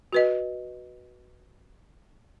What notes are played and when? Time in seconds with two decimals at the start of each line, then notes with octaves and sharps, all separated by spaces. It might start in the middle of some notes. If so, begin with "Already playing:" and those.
0.13 F#4 B4 D#5